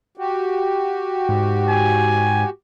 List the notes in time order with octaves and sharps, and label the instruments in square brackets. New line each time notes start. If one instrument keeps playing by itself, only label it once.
[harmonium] F#4 G4
[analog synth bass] G#2
[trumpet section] G#5